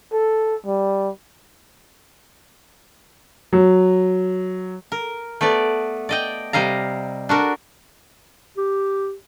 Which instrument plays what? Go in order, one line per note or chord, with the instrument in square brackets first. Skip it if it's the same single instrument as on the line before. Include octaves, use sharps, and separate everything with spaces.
[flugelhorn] A4
G3
[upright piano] F#3
[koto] A#4
A3 B3 B4 D5
D5 D#5 G5
C3 G3 D#5 F5 A#5
D4 F#4 A#4
[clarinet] G4